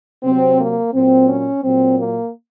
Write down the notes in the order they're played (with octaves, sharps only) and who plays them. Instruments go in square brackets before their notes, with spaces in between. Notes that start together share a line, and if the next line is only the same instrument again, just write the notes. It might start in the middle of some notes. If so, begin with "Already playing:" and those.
[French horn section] C3 F#3 C4
A#3
A#2 F#3 C4
C#4
A#2 F#3 C4
A#3